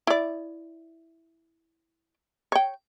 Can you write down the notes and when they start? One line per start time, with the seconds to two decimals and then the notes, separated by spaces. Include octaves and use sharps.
0.07 E4 D5
2.52 C#5 G5